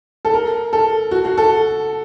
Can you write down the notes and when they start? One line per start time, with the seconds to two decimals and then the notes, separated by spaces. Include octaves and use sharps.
0.25 A4
0.34 A#4
0.73 A4
1.11 F#4
1.25 F#4
1.38 A4